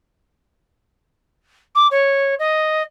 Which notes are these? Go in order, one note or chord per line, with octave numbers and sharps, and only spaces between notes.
D6
C#5
D#5